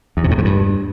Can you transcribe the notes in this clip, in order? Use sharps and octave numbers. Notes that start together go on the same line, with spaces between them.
E2
C3
A2
G#2
G2